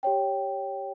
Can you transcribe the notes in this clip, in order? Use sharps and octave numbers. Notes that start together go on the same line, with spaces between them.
G4 C#5 G5